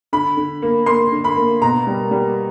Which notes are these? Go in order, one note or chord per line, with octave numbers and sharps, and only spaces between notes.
D3 B5
D3
A#3
A#3 C6
D3
B5
A#3
B2 A#5
G3
G3